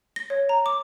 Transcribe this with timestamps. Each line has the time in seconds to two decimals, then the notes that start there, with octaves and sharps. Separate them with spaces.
0.16 A#6
0.30 C#5
0.49 A#5
0.66 D6